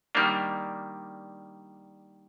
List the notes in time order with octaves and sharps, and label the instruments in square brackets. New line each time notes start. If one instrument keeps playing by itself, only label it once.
[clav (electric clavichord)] D#3 G3 A#3 D4